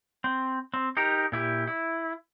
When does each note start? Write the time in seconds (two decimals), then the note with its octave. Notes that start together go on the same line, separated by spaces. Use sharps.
0.24 C4
0.74 C4
0.97 D#4 G4 A#4
1.32 A#2 E4 G4
1.68 E4